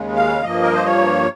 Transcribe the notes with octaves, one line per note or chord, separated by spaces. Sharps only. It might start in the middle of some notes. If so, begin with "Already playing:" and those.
Already playing: D#2 C#3 G#3
F5
G2 F3 A#3 D#5
A#4
C5
C#5